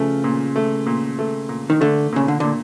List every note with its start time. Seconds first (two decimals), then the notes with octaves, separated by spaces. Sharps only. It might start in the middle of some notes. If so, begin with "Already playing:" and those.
Already playing: C#3 F3 A3
0.24 A#2
0.56 A3
0.86 A#2
1.19 A3
1.49 A#2
1.70 D#3
1.81 D3 A3
2.12 A#2 C#3
2.28 D3
2.40 A#2 D3